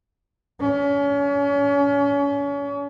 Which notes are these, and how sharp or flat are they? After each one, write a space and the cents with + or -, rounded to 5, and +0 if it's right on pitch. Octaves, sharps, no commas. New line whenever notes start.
C#4 +35